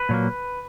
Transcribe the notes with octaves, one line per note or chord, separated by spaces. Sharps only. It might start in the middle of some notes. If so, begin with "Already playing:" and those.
Already playing: B4
A#2 F#3 A#3